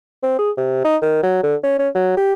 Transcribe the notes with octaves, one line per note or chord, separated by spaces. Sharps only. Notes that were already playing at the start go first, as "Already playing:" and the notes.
C4
G#4
C3
D#4
D#3
F#3
D3
C#4
C#4
F#3
G4